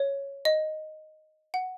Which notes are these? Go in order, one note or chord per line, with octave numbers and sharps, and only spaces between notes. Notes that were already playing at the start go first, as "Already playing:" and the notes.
Already playing: C#5
D#5
F#5